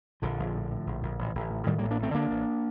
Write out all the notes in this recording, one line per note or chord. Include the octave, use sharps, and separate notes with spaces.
A#1 D3 F3
A#1
A2
A2
A#1
A#1
A1
A1
A2
A2 D#3 G3
A1 G3 A#3
A#3 D4
A1 A3 C4
D3 A#3 D4
A1